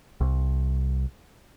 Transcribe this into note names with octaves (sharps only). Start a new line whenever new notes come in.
C2